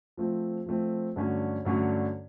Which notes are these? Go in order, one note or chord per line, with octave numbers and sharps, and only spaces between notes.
F3 A3 C4
F3 A3 C4
G2 D3 F#3 A3 C#4
G2 D3 F#3 A3 C#4